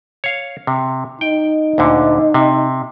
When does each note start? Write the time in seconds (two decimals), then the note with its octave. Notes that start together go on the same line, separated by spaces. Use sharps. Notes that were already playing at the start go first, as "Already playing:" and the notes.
0.24 C#5 F5
0.67 C3
1.21 D#4 G5
1.78 D2 A#2 D3
2.34 C3